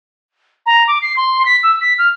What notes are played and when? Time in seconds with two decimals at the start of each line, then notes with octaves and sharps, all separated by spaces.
0.66 A#5
0.88 D6
1.02 C7
1.17 C6
1.45 B6
1.63 E6
1.81 B6
1.98 F6